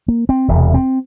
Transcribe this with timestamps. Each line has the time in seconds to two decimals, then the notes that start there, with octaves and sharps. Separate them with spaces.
0.08 A#3
0.29 C4
0.48 E1 E2 C3
0.74 C4